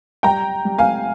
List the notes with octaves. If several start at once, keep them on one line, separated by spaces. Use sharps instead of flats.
G3 G5 A#5
G3
F5 G#5